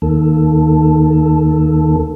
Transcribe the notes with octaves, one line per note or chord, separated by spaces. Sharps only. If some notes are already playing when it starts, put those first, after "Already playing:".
D#2 D#3 A#3 A4